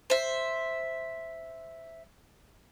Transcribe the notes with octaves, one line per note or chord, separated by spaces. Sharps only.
C5 E5